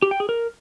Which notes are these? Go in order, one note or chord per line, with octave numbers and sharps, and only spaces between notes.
G4
G5
G#4
A#4